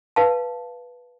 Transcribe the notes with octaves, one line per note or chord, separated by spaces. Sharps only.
B4 F5 A5